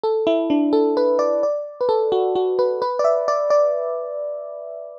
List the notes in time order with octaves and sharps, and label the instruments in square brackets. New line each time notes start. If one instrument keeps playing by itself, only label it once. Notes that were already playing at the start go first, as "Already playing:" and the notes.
[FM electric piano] A4
E4
D4
A4
B4
D5
D5
B4
A4
F#4
F#4
B4
B4
D5
E5
D5
D5